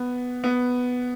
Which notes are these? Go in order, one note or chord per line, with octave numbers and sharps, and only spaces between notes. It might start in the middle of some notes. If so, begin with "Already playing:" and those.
Already playing: B3
B3